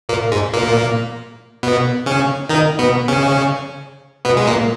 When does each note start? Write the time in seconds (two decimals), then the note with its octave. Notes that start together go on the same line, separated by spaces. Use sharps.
0.09 A#2 A#3
0.32 G#2 G#3
0.53 A#2 A#3
1.63 B2 B3
2.06 C#3 C#4
2.49 D#3 D#4
2.79 B2 B3
3.08 C#3 C#4
4.25 B2 B3
4.37 G#3
4.47 A#2 A#3